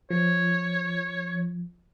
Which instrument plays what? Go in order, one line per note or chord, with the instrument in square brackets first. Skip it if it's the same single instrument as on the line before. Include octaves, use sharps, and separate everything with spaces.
[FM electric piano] F3 [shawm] C#5